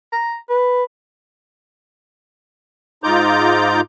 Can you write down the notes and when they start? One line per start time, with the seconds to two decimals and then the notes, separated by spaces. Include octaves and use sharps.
0.12 A#5
0.50 B4
3.04 G#2 D#4 F4 A#5 D6 G6